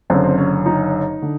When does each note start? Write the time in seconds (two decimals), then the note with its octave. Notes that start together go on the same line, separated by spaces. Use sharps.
0.10 F#1 F#2 D3 C4
0.24 C4
0.38 C#4
0.66 D#4
1.22 D3